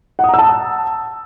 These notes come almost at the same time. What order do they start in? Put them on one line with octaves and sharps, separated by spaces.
F#5 D#6 A#5 E6 A5